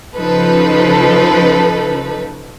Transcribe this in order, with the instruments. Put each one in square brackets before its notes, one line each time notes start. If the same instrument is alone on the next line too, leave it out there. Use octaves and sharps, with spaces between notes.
[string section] C#3 F3 D#4 A4 B4